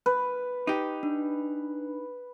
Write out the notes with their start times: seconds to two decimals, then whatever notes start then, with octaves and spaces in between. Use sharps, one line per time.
0.06 B4
0.67 D#4 G4
1.03 D4